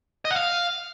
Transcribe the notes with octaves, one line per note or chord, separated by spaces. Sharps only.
D#5
F#5
F5